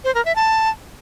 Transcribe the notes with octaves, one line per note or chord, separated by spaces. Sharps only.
C5
A#4
E5
A5